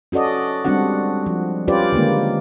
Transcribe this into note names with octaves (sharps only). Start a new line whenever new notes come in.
C#4 F#4 A4 D5 D#5
G3 G#3 C4 D4 F#4 F#5
F3
C#4 F4 G4 B4 C5 D5
D3 D#3 G#3 A#3